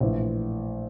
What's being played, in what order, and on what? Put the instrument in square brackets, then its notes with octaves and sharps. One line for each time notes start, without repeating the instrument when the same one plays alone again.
[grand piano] A#1 A2 E3